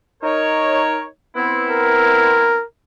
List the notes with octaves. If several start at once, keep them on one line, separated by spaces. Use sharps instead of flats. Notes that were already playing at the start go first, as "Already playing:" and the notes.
D#4 A#4 C#5
B3 C4 E4
A#4